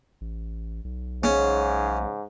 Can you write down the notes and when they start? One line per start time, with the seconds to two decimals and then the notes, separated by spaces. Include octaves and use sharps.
0.21 A1
0.84 B1
1.24 G#2 C#3 C#4